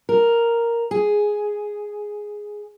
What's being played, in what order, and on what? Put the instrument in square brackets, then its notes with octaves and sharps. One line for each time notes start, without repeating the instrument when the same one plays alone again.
[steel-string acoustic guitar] A#4
G#4